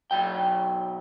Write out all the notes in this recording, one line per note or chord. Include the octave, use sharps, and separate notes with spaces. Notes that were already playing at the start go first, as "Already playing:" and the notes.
B1 F#3 G5